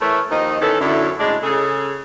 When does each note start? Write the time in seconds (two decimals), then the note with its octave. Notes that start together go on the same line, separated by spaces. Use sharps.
0.01 E3 A3 E4 A#4 B4 C#5
0.31 D#2 D#3 F3 D#4 D#5
0.61 D#3 E3 B3 C#4 A4
0.80 F#2 D3 E4
1.19 A2 C#3 G#3 D4
1.43 C#3 G#4 A4